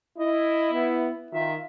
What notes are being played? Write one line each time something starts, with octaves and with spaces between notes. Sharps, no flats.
E4 D#5
B3
D#3 F4 E5